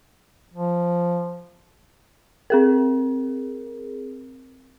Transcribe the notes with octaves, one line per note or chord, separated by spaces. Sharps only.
F3
C4 G#4 A#4